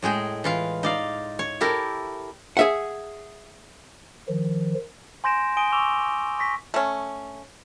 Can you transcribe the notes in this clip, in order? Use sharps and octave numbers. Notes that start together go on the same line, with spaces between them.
A2 G#3 G#4 G5
E3 F4 F5
D#4 D5 F5
C#5
E4 G4 A4 A#4
G#4 E5 F#5
D#3 F3
G#5 C6 G6 A#6 D7 E7
G#5 D#6 D7 D#7 G7
C#6 D6 E6 E7 F7 G7
C#6 A#6 B6
A3 C#4